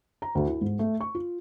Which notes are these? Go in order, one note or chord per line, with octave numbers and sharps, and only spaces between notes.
A#5
D2
E4
G#2
A3
C#6
F4